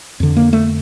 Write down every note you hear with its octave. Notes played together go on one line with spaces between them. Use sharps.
F2 D3
A#3
A3